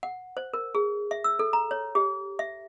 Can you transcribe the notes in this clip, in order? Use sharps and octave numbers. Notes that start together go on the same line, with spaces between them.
F#5
C5
A#4
G#4
E5
E6
A4
A#5
C#5
G4
E5